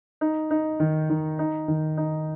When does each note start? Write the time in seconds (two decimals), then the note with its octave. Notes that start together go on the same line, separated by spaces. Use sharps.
0.21 D#4
0.51 D#4
0.80 D#3
1.10 D#3
1.39 D#4
1.68 D#3
1.97 D#4